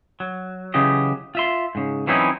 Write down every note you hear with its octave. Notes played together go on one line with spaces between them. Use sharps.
F#3
C#3 E3 F#3 G4 D#5
F4 E5 C6
G#2 C#3
E3 F#3 C4 C#4 D#4 E4